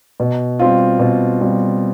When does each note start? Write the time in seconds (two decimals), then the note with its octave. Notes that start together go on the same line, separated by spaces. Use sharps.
0.20 B2
0.59 G3 C4 F4
0.99 B2
1.41 G3 C4 F4